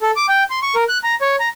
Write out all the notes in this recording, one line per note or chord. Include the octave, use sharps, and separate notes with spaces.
A4
D6
G5
C6
C#6
A#4
F#6
A#5
C#5
A#5